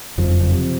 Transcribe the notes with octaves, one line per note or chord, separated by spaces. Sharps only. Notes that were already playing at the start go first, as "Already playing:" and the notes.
F#1 F2 F3
C3